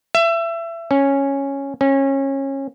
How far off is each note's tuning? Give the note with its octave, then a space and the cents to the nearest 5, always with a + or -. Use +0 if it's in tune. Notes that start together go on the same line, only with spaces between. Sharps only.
E5 +25
C#4 -5
C#4 -25